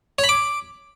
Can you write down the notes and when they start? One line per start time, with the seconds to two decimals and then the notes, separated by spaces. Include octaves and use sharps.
0.19 C#5
0.24 B5
0.29 D6